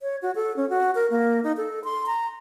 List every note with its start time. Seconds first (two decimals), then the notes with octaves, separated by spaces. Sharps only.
0.01 C#5
0.22 F#4
0.35 A4
0.57 C#4
0.70 F#4
0.95 A#4
1.10 A#3
1.44 D#4
1.57 A4
1.84 C6
2.07 A#5